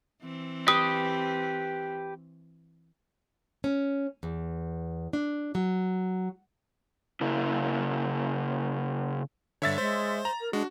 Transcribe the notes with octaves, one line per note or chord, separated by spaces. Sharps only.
E3 C4
G4 B4 D#6
C#4
E2
D4
F#3
C#3 A#3 E4
G2 D3 C#5 E5 A6
G#3 C5
A#5
A#4
G#3 D4 F#4